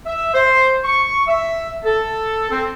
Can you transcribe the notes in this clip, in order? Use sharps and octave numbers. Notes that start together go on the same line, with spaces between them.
E5
C5
C#6
E5
A4
C4